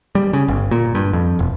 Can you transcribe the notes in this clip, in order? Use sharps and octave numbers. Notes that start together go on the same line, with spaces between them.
G3
C#3
G1
A#2
G2
F2
E1